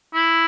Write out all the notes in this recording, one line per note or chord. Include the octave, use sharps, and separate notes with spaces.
E4